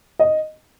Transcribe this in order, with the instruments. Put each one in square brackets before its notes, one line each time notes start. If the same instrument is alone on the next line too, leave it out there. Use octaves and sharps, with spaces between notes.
[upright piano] D#5